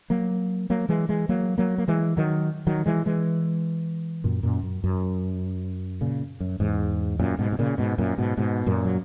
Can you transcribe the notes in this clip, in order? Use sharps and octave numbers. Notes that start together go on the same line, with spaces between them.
F#3 A#3
F#3 A#3
E3 G#3
E3 G#3
F#3 A#3
F#3 A#3
A#3
E3 G#3
D#3 F#3
D#3 F#3
E3 G#3
E3 G#3
F#2 A#2
F#2 A#2
F#2
F#2
A#2 C#3
F#2
E2 G#2
F#2 A#2
G#2 B2
B2
A#2 C#3
G#2 B2
F#2 A#2
G#2 B2
G#2 B2
F#2 A#2
F#3